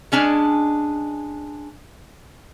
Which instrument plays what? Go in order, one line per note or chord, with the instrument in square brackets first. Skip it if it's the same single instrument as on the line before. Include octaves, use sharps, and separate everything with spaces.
[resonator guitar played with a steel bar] G#3 C#4 D4 G#5